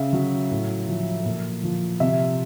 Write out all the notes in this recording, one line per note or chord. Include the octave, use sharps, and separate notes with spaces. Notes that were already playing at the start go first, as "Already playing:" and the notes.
Already playing: C#3 E5
F#3
A2
F3
A#2
F3
C3 E5